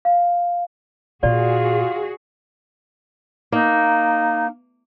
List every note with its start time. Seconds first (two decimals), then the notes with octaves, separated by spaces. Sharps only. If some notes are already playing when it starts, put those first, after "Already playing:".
0.05 F5
1.23 A#2 F4 F#4 G#4 D5
3.52 A#3 D#4